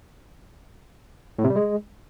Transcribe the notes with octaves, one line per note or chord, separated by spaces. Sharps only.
A2
C3
G3
G#3